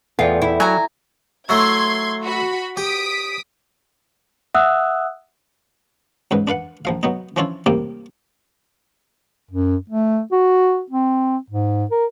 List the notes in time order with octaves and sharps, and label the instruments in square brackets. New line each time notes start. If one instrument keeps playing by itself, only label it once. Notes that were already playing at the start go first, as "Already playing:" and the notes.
[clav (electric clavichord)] E2 [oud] F4 [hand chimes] A4 D5 G5
[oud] E4
[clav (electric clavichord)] F#3 [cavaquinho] G#5 A#5
[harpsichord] F#3 A3 E4 [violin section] C6 G#6
[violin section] F#4 B5
[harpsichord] G4 [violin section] D#6 B6 D7
[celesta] E5 F#5 D#6 E6 F#6
[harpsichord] C#2 G#2 B4
D4 B4 F5 F#5
A#1 F3 F5
F#3 B3 D#4
E3 F3 C#4 D4 E4 F4
A1 C3 G3 A#3 D6
[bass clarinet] F#2
A3
F#4
C4
G#2
A#4